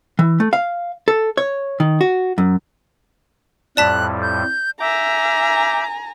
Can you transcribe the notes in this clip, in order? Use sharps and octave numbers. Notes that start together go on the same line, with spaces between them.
E3
A3
F5
A4
C#5
D#3
F#4
F#2
F2 A2 G3 D5 A5 F#6 B6
G6
E5 G#5 A#5 D6 G6